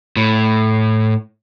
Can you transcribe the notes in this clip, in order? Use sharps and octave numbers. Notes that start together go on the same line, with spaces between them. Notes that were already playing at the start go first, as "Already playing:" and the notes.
A2